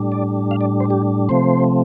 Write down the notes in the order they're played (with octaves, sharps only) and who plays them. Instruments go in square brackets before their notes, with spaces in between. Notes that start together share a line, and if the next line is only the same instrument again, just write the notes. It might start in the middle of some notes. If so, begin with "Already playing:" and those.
Already playing: [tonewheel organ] A2 G3 D4
D5
F5
D5
C5
G4
C3 F3 A3 C4 C5